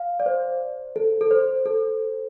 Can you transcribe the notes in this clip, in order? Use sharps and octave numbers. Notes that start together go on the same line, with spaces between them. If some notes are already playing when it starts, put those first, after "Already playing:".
Already playing: F5
D5
C5
A4
A4
C5
A4